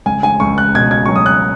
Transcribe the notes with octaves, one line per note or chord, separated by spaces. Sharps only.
C#2 G#5
G#5
C#2 C#6
F#6
B2 G#6
G#6
F#3 C#6
D#6
F#6